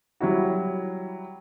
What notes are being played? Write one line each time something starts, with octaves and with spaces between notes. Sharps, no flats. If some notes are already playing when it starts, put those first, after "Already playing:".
F#3 G3 E4 F#4